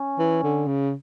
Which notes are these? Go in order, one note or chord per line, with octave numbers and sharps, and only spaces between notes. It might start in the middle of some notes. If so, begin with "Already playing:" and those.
Already playing: C#4
E3
D3
C#3